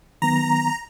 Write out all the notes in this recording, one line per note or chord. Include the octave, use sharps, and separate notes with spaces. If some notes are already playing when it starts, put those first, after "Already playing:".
D#3 F#3 B3 A#5